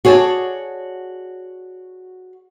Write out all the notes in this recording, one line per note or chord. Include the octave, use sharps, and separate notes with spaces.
F#4 G#4 C#5 D5 A5